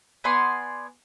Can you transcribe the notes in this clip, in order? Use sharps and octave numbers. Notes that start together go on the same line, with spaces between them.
B3 D5 G#5 C6